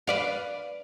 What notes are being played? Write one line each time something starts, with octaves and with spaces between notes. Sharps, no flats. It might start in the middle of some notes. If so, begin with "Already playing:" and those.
B4 D5 F5